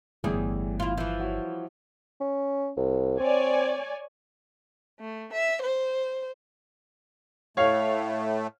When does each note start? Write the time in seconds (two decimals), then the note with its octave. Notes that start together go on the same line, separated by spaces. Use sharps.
0.24 G1 E2 A2 E3 G3 G#4
0.80 E4 F4
0.97 E3 F3 E4
1.20 E4 F#4 C#5
2.21 C#4
2.77 C2
3.20 C4 C#5 D5 G#5
4.99 A3
5.33 E5
5.62 C5
7.57 A2 A3 C#5 F5